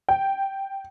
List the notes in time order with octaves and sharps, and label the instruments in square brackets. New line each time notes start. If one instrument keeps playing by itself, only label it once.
[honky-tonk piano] G5